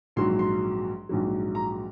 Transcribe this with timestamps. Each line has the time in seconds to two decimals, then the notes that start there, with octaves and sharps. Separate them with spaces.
0.16 A#1 G#2 F#3 C6
0.39 C6
1.09 A#1 G#2 F#3
1.55 A#5